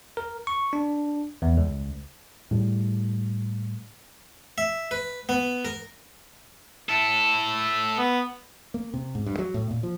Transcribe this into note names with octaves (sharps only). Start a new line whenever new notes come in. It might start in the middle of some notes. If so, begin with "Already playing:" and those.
A#4
C#6
D4
E2
C#2
A2 G3
E5
B4
B3
A#4
E4 A4
B3
A#3
C3
G#2
G2
F#3
A2
A#2
F3